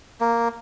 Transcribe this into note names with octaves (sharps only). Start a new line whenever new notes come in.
A#3